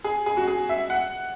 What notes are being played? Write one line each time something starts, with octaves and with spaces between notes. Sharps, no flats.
G#4
G#4
F#4
G#4
E5
F#5